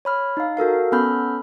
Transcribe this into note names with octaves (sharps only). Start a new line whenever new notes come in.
C#5 B5 F6
D#4 F5
F#4 A4 A#4 F5
B3 C#4 A4 B5 F6 G6